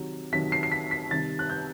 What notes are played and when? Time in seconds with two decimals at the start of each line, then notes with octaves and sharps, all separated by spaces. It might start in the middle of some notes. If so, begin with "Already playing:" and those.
Already playing: C3 D#3 F#3
0.33 C3 D#3 F#3 B6
0.52 C7
0.63 C7
0.72 B6
0.91 B6
1.11 C3 D#3 G3 A6
1.39 F#6
1.50 G6